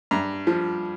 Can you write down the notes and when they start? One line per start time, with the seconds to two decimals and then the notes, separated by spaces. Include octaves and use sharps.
0.11 G2 A#5
0.47 F3